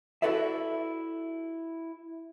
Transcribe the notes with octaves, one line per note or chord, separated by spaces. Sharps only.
E4 F#4 A4 B4 D5 E5